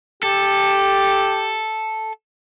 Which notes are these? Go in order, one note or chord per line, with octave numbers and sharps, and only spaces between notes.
G4 A4